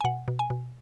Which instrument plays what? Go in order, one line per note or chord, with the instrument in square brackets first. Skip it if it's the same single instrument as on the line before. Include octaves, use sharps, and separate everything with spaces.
[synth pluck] G#5
B2 F#5
B2
G#5
B2